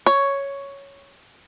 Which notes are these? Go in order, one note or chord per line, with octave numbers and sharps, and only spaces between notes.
C#5